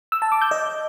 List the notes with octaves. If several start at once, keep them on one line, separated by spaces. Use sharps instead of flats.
E6
A5
D6
G6
D#5